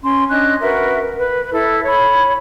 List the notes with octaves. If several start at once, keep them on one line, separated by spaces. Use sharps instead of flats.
C#4 C6
C#4 D4 D#5 F#6
F#4 A#4 B4 E5
B4
E4 A4 E5
C#5 B5